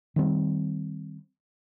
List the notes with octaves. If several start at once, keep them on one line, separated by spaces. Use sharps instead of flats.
D#3 G3 C4